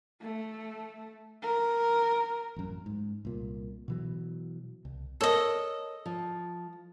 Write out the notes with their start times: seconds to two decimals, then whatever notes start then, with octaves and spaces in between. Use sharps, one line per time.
0.21 A3
1.43 A#4
2.56 A1 F#2
2.86 G#2
3.25 C2 A#2
3.88 B2 E3 F#3
4.85 C2
5.21 A4 A#4 C#5 D#5
6.06 F3